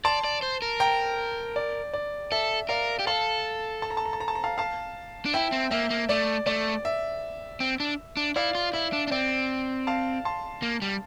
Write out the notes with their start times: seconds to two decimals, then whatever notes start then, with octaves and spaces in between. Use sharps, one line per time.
0.05 D5 A5 C6
0.24 D5
0.42 C5
0.62 A#4
0.80 G5 A#5
1.56 D5
1.94 D5
2.32 A4 E5
2.69 A#4 D5 F5
2.99 G4
3.07 A4 F5 A5
3.82 A5
3.90 A#5
3.97 A5
4.06 A#5
4.13 A5
4.20 A#5
4.28 A5
4.35 A#5
4.44 F5 A5
4.58 F5 A5
5.26 D4
5.34 E4 E5 G5
5.52 C4
5.71 A#3 E5
5.90 A#3
6.09 A3 D5
6.46 A3 D5
6.85 E5
7.60 C4
7.80 D4
8.17 D4
8.36 E4 D5 F5
8.55 F4
8.73 E4 E5
8.93 D4
9.07 D4
9.11 C4 D5
9.87 F5 A5
10.25 A5 C6
10.62 A#3
10.82 G3